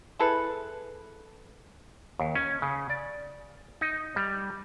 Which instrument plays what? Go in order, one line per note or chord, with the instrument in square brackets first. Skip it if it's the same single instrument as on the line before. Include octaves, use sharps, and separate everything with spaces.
[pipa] E4 G#4 A4 B4
[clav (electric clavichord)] D#2
C#4
C#3
D5
D#4
G3